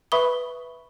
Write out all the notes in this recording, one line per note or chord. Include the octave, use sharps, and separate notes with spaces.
B4 E5 B5 C#6 D#6 G7